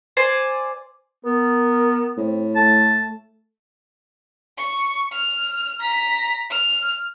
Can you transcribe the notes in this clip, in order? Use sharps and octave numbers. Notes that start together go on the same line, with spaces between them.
C5 D5 G#5
B3 A#4
A2 C4
A3 A5
C#6
F6
A#5 B6
F6